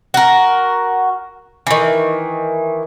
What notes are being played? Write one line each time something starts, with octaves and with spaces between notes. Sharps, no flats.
F#4 A#4
D#3 E3